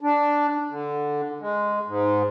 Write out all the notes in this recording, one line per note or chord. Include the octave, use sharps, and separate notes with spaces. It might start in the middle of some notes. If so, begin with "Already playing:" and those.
D4
D3
G#3
G#2